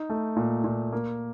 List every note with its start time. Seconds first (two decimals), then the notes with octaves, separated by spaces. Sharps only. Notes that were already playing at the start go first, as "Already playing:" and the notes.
Already playing: D#4
0.10 A3
0.36 A#2
0.64 A#2
0.92 A#3